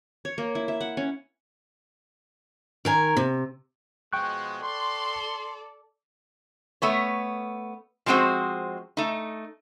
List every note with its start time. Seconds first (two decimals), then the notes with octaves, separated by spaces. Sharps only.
0.25 C#5
0.38 A#3
0.55 E4
0.68 E5
0.81 F#5
0.97 C#4
2.85 D#3 A#4 G#5
3.17 C3
4.13 B2 F3 G#3 G5 C#6 F#6
4.62 A4 D5 C6
6.82 A3 B3 C#5
8.06 F3 G3 G#3 C4 F#4 C5
8.97 A3 D#4